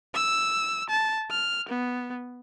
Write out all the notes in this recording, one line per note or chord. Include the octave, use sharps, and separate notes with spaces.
E6
A5
F6
B3